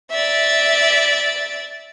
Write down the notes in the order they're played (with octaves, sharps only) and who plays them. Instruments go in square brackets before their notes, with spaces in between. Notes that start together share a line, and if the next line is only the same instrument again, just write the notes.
[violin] D5 E5